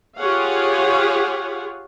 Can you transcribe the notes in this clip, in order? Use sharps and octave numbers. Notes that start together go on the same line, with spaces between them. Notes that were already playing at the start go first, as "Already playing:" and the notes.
F4 G4 G#4 C#5 F5 F#5